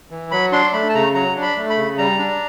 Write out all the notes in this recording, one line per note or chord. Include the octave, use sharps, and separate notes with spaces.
E3
F#3 B5
D4 C6
A3 B5
A5
C#3 A#5
F#3 A#5
D4
B5
A3
B5
C#3
G3 A#5
D4